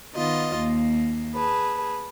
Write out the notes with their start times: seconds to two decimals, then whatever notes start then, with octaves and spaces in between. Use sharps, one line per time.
0.13 D#3 B3 F4 D#5 A6
0.56 D#2 A#3
1.34 G#4 B4 A5